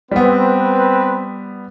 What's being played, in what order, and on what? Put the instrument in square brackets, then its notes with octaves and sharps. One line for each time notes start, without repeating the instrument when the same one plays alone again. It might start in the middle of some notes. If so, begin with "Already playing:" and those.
[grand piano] G3 B3 [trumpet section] C4 B4